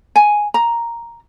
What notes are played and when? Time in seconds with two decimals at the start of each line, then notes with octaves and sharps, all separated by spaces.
0.16 G#5
0.54 A#5